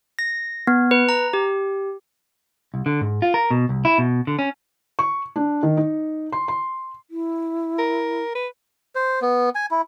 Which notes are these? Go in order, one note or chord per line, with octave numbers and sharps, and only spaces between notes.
A#6
B3
B4
A#5
G4
C2
D3
G#2
F4
A#4
B2
C2
E4
B2
D3
C#4
C#6
D4
D#3
D#4
C6
C6
E4
A#4
B4
C5
B3
G#5
E4